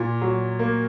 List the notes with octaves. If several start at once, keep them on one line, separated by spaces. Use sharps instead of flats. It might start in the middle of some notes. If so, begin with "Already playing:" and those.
Already playing: A#2
F#3
A#3